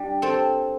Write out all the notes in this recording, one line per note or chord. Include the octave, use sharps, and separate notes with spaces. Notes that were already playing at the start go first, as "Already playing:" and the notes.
Already playing: G3 D4
C4 A4